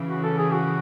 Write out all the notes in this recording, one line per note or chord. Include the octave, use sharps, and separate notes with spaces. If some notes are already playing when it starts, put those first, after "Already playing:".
Already playing: C#3 E3
F#4
A4
G#4
F#4